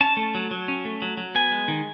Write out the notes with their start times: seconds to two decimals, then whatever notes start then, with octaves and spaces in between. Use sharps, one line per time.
0.01 C#4 A5
0.17 A3
0.35 F#3
0.51 F#3
0.68 C#4
0.85 A3
1.02 F#3
1.17 F#3
1.35 B3 G#5
1.52 G#3
1.68 D#3